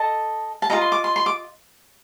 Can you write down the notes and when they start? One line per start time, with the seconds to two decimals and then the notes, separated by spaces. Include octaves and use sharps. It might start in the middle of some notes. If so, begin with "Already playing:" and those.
Already playing: A4 D#5 A5
0.62 A5
0.70 F4 A4 D#5 A#5
0.81 C6
0.92 D6
1.04 C6
1.16 C6
1.26 D6